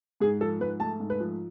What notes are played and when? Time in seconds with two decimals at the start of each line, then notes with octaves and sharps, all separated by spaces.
0.20 G#2 G#4
0.41 F3 A4
0.60 G#2 B4
0.80 A3 A5
1.00 G#2
1.10 B4
1.20 F3